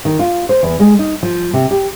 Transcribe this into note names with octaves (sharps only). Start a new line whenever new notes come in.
D#3
F4
C5
E2
G#3
D#4
F3
C3
G4